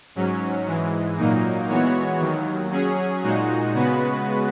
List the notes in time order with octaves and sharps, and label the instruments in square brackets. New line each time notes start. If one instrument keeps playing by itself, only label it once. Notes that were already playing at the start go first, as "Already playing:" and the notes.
[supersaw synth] G#2 F#3 C#4
G#2 E3 G#3
A#2 F#3 A#3 D#4
E3 G#3 B3 F#4 C#5
D#2 D#3 F#3
F#3 C#4 G#4
A#2 G#3 D#4 F#4
C#3 G#3 B3 F#4 B4